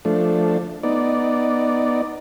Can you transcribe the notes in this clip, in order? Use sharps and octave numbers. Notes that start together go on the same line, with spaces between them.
F3 A3 D4
B3 D#4 D5